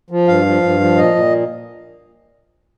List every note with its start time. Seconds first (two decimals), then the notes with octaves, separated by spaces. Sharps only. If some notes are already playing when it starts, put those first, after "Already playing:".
0.10 F3
0.27 G2 F5
0.46 F3
0.63 G2
0.80 F3
0.96 A#2 D#5
1.15 A#2